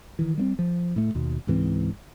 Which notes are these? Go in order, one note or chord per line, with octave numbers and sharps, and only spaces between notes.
D#3 E3
G3 A#3 C4
F3
A2 A3
D#2 B2
C#2 G#2 E3 C4